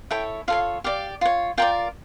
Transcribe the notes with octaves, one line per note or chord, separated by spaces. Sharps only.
E4 A4 C#5 G5
F4 A4 C#5 F5
G4 D5 F5
F4 C#5
F4 A#4 D5 G5